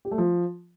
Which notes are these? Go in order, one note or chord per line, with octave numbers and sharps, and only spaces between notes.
G4
A3
F3